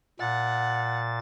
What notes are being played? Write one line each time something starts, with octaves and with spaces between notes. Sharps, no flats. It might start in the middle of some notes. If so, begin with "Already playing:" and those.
A#2 F#5 A6